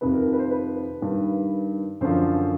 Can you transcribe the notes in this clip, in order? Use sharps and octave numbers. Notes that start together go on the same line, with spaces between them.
F2 C3 D#3 B4
A#4
A#4
B4
C5
B4
G2 D#3
F#2 D3 F3 C5